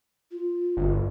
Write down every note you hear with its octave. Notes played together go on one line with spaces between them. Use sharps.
F4
G1